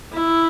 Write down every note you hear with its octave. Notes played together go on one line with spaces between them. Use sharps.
E4